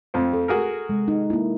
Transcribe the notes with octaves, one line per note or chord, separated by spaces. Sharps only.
F2 C4
A4
F#4 G#4 A#4
C3 G#3
D#4
A#3 E4